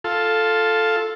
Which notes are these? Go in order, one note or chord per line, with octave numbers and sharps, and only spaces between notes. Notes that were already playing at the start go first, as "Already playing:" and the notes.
F4 A4